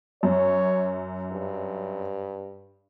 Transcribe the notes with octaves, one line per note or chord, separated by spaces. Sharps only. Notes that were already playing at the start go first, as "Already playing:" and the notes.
F#2 C#5
G2